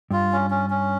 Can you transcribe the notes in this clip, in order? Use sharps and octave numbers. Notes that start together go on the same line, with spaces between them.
G2 F4
C#4
C#4
C#4